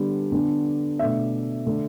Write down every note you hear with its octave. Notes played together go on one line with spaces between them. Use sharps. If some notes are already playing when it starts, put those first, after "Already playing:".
Already playing: D3 G3 B3
D3 B3 D4
B2 A3 D4 E5
D3 A3 D4